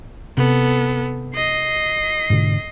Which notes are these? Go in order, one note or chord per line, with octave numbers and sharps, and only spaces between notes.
C3 B3 A4
D#5 C7
G#2 B2 D3